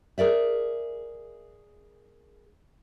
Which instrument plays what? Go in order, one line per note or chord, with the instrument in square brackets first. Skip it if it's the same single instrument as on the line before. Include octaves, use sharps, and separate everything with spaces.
[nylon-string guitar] G#4 A#4 D5 E5